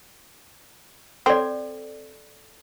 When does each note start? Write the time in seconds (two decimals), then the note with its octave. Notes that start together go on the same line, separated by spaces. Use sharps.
1.26 C4 A4 D5